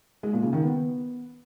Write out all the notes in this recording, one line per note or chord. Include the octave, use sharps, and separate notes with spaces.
G#3
A#2
C#3
D#3
B3